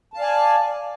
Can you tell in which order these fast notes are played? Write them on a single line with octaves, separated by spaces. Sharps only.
A5 F5 D5 G#5